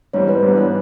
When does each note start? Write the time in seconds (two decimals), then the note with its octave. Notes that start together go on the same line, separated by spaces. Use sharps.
0.13 G#2 E3 G3 C4 C#5
0.28 B4
0.43 G#2 E3 G3 B3 D4